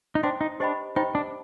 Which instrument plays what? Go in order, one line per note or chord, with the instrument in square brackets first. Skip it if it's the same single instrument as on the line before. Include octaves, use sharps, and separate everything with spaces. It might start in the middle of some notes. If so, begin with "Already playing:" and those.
[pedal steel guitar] D#4
[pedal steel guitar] D4 [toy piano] C5 G5 C6
[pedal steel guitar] D#4
[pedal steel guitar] D4 [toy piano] G4 C5 D#5 G5 B5
[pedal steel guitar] D#4 [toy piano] G4 C5 D#5 G5 B5
[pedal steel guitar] D4